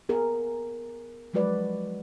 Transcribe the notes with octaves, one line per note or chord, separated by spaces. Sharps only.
B3 G#4 A#4
F3 F#3 G#3 F#4 B4 D5